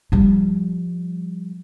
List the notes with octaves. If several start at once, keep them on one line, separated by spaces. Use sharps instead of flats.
F3 G3